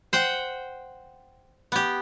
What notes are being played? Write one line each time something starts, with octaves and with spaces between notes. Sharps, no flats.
C5 F#5 G5
B3 G4